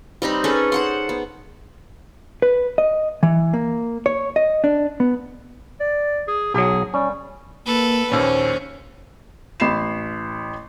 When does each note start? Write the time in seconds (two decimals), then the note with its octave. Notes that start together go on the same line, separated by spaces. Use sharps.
0.22 G3 C4 D#4 B5
0.44 C#4 G#4 A4 B4
0.72 C5 F#5 C6
1.09 B3
2.42 B4
2.78 D#5
3.23 E3
3.53 A#3
4.06 C#5
4.36 D#5
4.64 D4
5.00 B3
5.80 D5
6.28 G#4
6.54 B1 F#3 G#4
6.94 G3 C#4
7.66 A#3 A4 B4
8.12 A#1 D#2 C#4 C5
9.60 A1 B5 C7 E7